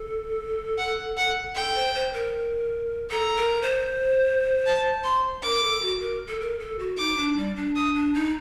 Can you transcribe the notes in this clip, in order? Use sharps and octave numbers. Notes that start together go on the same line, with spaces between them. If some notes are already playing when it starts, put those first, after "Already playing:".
Already playing: A4
F#5
F#5
A4 G5
C5
C5
A#4
A4 A#5
A#4
C5
A5
C6
A#4 D6
A4
F#4
A#4
A4
A#4
A4
F#4
D#4 D6
D4
G3
D4
D4 D#6
D4
D#4